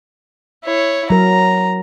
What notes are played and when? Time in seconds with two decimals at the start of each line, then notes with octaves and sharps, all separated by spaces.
0.64 E4 C#5
1.10 F#3 A#4 A#5